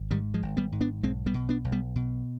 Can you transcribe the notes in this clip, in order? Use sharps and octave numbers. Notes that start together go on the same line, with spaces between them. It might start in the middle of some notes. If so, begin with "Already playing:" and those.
Already playing: G#1
G#2 D#3 G3
F3 G#3
G#1
G3 B3
G#2
B3 D4
B1 G#3 C4
G3 B3
B2
B3 D4
B1
G3 B3
B2